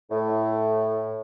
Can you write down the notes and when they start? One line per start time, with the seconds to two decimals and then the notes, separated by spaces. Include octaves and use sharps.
0.11 A2